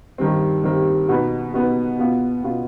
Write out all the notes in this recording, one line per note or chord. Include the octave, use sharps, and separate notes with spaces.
G2 D#3 G3 C4
G2 D#3 G3 C4
B2 B3 D#4 B4
B2 B3 D#4 B4
B2 B3 F4
B2 B3 F4